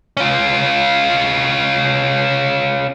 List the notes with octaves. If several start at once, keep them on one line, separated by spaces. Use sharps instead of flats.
C#4 F4